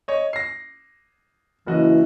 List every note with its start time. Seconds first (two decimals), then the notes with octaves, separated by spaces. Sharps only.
0.08 C#5 D#5
0.33 A#6 C7
1.67 F#1 E3 F#4 D#5